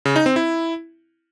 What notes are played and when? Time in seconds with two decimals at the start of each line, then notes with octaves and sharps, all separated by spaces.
0.05 C#3
0.16 D#4
0.26 C4
0.36 E4